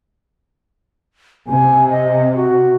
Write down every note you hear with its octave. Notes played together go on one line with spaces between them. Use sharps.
C3 G#5
D#5
F#4